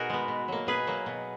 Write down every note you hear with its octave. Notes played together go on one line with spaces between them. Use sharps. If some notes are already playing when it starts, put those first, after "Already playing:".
Already playing: B2 D#4 F#4 G#4 A#4
G#3 B3
B2
F#3 A#3
B2 G#4 B4
F#3 A#3
B2